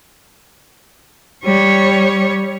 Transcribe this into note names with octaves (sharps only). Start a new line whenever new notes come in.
G3 C#5